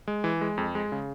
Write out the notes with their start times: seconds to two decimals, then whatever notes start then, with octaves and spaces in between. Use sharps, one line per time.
0.08 G#3
0.24 E3
0.41 G#3
0.58 F2
0.75 G#3
0.92 C#3